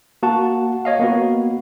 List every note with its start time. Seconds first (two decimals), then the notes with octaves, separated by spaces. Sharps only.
0.23 A#3 F#4 F#5 A5
0.85 C#5 D#5 F5
0.99 A#3 B3 F#4